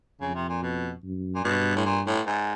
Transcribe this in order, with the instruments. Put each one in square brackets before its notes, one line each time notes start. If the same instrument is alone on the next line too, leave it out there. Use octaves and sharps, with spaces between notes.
[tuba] F2 [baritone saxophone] C#3
[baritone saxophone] C3
A#2
B2
[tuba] F#2
[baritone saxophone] A#2
[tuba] G2 [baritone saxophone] B2
[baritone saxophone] A2
A#2
A2
G#2